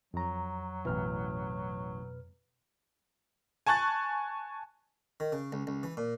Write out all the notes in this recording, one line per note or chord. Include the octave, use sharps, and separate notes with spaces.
F2 F#3 A#5
A1 B2 E3 B4 F6
G#5 A5 C#6 F#6 A6
D#3
C#3
C#2
C#2
E3
A#2